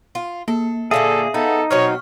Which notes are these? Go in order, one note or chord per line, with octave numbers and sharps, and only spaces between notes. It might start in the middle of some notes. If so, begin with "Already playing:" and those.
F4
A#3 A4
A#2 D3 A#3 G#4 A4 E5 F5
B3 D#4 G#4 A4
B2 F#3 C4 C#5 C#6 F6